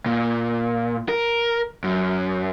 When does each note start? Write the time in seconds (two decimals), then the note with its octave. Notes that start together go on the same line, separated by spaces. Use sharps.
0.06 A#2
1.09 A#4
1.84 F#2